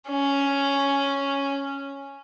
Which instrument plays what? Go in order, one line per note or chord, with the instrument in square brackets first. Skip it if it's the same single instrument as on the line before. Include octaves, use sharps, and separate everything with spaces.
[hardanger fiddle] C#4